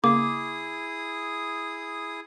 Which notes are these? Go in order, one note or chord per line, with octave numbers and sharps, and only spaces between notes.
C#3 A#3 E4 G#4 D6 D#6